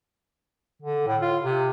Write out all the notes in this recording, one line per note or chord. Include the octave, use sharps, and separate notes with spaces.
D3
A2
F4
C3